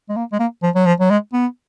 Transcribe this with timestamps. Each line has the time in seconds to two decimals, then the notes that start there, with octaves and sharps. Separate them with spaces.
0.09 G#3
0.16 A#3
0.32 G#3
0.40 A#3
0.63 F3
0.75 F#3
0.86 F3
1.00 F#3
1.10 G#3
1.33 B3